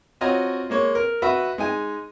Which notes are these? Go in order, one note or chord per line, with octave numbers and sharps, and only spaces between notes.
C4 F4 F#4 C#5 D#5 A#5
G#3 A#3 C#5
A#4
F#4 B4 D#5 E5
G#3 D#4 G#5